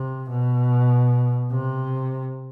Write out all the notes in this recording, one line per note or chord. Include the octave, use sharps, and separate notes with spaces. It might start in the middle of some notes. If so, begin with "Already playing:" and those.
Already playing: C3
B2
C3